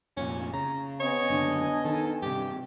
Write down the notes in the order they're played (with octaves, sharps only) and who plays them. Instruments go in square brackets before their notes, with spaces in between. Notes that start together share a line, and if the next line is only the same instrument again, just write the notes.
[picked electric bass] F1 A#2 [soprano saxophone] C#4
[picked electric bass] C#3 [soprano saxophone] A#5
[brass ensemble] B3 D#5 G#5 [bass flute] C4 [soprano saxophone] C#5
[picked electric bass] F#1 A2 D3 [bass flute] D4
[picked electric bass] D#3 [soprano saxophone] A4
[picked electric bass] G2 C3 [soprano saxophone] G4